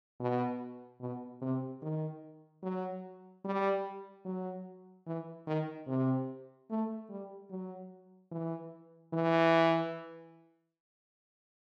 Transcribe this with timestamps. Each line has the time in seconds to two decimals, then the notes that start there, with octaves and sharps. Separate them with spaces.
0.20 B2
1.00 B2
1.41 C3
1.82 D#3
2.63 F#3
3.45 G3
4.25 F#3
5.06 E3
5.47 D#3
5.87 C3
6.70 A3
7.10 G3
7.50 F#3
8.31 E3
9.13 E3